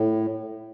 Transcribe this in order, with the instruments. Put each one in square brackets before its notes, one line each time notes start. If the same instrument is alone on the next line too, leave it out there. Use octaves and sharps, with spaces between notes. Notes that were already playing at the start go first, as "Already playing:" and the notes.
Already playing: [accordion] A2